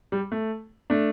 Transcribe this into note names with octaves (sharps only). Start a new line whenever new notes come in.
G3
A3
A3 D4